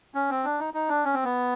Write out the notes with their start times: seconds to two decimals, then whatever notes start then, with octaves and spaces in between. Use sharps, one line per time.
0.15 C#4
0.30 C4
0.44 D4
0.60 D#4
0.74 D#4
0.89 D4
1.04 C#4
1.14 C4
1.24 B3